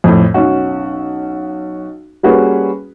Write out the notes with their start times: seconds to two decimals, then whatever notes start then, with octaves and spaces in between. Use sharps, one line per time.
0.04 F2 A2
0.34 B1 C#4 F#4
2.23 G3 A#3 C#4 F#4 G#4 B4